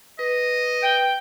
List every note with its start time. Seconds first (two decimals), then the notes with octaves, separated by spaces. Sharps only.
0.19 B4 D#5
0.83 G5